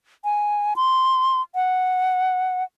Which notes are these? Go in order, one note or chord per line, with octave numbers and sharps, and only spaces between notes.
G#5
C6
F#5